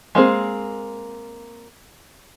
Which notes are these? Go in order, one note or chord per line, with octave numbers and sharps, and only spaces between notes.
G#3 A#3 C4 G#4